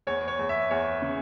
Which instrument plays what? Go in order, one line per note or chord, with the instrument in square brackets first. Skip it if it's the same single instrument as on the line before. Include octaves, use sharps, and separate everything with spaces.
[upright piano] E2 C#5
C#5
E2
E5
E2 C#5
C#3